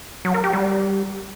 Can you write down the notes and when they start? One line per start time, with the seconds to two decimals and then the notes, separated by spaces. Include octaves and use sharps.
0.25 F#3
0.34 A#4
0.44 G4
0.53 G3